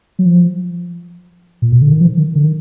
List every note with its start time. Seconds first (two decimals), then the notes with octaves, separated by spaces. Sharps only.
0.19 F#3
0.26 F3
1.62 A#2
1.72 B2
1.82 D3
1.91 D#3
2.01 F3
2.18 D#3
2.35 D3
2.44 D#3